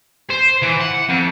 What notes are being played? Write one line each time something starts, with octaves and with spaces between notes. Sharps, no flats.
C5
E3
F#5
F2